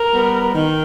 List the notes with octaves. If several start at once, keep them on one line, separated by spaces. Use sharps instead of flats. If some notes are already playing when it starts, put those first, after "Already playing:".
Already playing: A#4
G3 B3
D#3